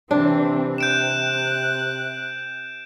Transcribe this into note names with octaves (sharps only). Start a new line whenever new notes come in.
C3 E3 C4 D4
F#6 G6 D7 E7